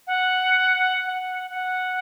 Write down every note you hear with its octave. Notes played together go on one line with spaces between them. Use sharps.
F#5
F#5
F#5